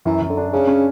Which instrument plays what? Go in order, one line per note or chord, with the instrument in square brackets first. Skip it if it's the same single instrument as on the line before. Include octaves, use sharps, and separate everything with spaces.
[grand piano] F#2 [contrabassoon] E3
[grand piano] F#2
[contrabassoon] D3
[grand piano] D4
[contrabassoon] C#3 [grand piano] C#4
[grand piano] C#4